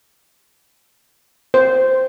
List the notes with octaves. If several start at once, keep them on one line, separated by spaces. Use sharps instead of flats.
C5